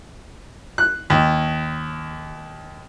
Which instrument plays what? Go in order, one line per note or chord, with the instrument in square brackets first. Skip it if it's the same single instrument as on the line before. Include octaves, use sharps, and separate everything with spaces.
[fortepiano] F#6
D#2